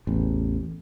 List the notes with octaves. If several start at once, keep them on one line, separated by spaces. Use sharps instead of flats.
A1 E2